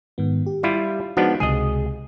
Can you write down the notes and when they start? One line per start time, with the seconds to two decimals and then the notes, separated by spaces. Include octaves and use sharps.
0.18 G#2 D#3 B3
0.46 G4
0.63 G3 E4 F4
1.17 F3 G#3 B3 D4 D#4 F#4
1.40 C#2 C3 G#3 G#4 D#5